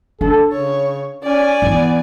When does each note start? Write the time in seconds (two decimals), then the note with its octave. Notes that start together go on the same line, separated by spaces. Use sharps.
0.21 D4 A4
0.52 C#3 C#5
1.23 C#4 D5 G#5
1.62 E3 B3 E4